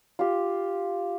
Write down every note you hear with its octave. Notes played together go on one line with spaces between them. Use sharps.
F4 G4